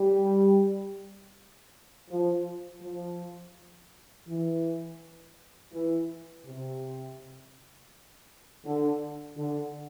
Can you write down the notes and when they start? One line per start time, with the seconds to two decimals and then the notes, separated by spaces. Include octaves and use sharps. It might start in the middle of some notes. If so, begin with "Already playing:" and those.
Already playing: G3
2.09 F3
2.81 F3
4.28 E3
5.73 E3
6.45 C3
8.65 D3
9.37 D3